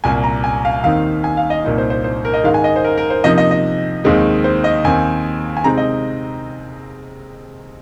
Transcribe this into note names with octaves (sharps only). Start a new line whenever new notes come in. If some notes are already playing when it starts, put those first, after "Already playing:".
C2 A#2 A#3 G#5
A#5
G#5
F5
D#2 D#3 C4 D#4 F5
G#5
F5
D#5
C2 A#2 A#3 D#4
C5
C5
C5
A#4
D#5
G#2 D#3 G#3 F5
G#5
D#5
C5
A#4
A#4
C5
C3 F3 A#3 D#4 D#5
D#5
D#5
D#2 D#3 G#3 C4 D#4
C5
D#5
D#2 D#3 C4 D#4 G#5
G#5
C3 G#3 C4 D#4 A#5
D#5